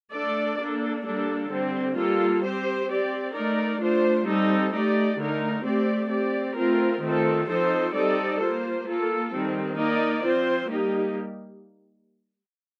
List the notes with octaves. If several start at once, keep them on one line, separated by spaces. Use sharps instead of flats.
A3 D4 A4 D5
A#3 D4 A4
G3 A#3 D4 A4
D3 G3 C4
G3 A#3 F4 A4
C4 G4 C5
C4 G4 D5
A3 D#4 A#4 D5
A3 D4 F4 C5
G3 C4 D#4 A4
A3 D#4 G4 D5
D3 A3 D#4 A#4
A3 C4 G4 D5
C4 G4 D5
A3 C4 F4 A#4
D#3 A3 C4 F4 A4
F3 C4 D#4 A4 C5
G3 C4 D#4 A4 D5
A#3 F4 C5
A#3 F4 A4
D#3 G3 C4
A#3 D#4 A#4 D5
F3 C4 F4 C5
G3 A#3 D#4 G4